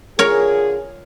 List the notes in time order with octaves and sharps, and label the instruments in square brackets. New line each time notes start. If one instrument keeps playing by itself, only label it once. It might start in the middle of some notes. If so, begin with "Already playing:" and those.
[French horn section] D3 F4 G#4 [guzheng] A#4 C#5